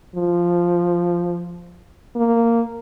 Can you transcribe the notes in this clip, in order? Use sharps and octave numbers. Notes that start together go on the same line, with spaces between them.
F3
A#3